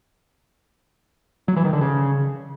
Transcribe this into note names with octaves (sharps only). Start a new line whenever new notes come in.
F#3
E3
D#3
D3
C#3